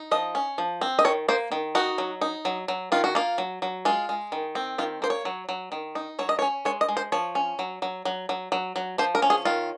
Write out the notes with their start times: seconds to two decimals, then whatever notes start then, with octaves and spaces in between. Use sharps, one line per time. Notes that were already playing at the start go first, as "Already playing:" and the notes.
Already playing: D#4
0.11 F3 D#5
0.35 C#4
0.58 F3
0.81 C4
0.99 D#5
1.05 D#3 C#5
1.29 A#3 C5
1.52 D#3
1.75 D#4 F#4
1.98 F#3
2.21 D#4
2.45 F#3
2.68 F#3
2.92 D#3 F4
3.04 F#4
3.15 A#3 F4
3.38 F#3
3.62 F#3
3.85 G#3 F4
4.09 G#3
4.32 D#3
4.55 C4
4.78 D#3 F4
5.02 A#3 C5
5.10 C#5
5.25 F#3
5.49 F#3
5.72 D#3
5.95 D#4
6.19 F#3 C#5
6.29 D#5
6.39 C#5
6.42 C#4
6.65 G#3 C#5
6.81 D#5
6.89 G#3
6.97 C5
7.12 F3 C#5
7.35 C#4
7.59 F#3
7.82 F#3
8.05 F#3
8.29 F#3
8.52 F#3
8.76 F#3
8.98 F3 C5
9.15 A#4
9.22 C#4
9.30 G#4
9.45 D#3 F4